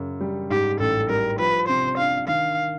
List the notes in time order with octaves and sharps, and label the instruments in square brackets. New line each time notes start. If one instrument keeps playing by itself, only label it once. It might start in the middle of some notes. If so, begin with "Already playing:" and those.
Already playing: [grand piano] F#2 C#3
G3
[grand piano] G#2 [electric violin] G4
[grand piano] A1 [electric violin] A4
[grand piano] G3 [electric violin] A#4
[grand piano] F3 [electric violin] B4
[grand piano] C3 [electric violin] C5
[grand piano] D4 [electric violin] F5
[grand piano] D#3 [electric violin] F5